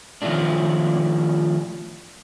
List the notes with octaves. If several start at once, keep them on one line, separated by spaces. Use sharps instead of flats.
D#3 F3 F#3 A3 D4